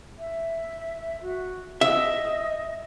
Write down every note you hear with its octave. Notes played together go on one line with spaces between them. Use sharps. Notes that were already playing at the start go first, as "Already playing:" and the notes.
E5
F#4
D#5 E5